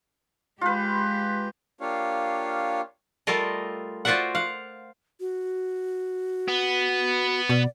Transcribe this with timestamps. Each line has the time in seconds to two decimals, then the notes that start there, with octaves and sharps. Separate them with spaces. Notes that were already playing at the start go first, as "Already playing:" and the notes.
0.61 G#3 F4 G4 B4
1.81 A#3 D4 F4 G4 C#5 F5
3.27 G3 A3 F4 A4 A#4 D#5
4.05 F4 F#4 C5 D5 E5 F#5
4.35 F5 F#5
5.20 F#4
6.48 B3
7.49 B2 D5